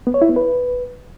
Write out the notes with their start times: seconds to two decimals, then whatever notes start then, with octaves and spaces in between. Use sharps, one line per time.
0.07 B3
0.14 C#5
0.22 E4
0.29 B3
0.36 B4